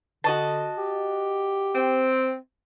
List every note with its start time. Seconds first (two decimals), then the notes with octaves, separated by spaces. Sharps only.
0.24 D3 F#4 D#5 A5
0.78 G4
1.74 C4